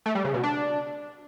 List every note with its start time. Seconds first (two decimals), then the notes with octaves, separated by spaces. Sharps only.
0.06 A3
0.15 G3
0.25 C#3
0.34 B2
0.43 D4